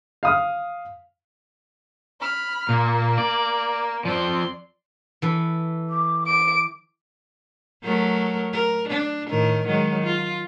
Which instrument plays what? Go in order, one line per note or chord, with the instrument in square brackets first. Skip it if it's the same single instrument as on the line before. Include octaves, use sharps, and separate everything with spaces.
[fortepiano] F5 D#6 F6
[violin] B5 F6
[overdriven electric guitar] A#2 [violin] A#3
[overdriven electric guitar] D5
[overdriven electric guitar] F3 C4 [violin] D5 C6
[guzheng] E3 A4 B4
[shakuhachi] D6
[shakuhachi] D6 [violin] D7
[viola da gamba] F#3 A3 A#4
A#4
D4
A2 D#3 A#4
D#3 F#3 G#3
F4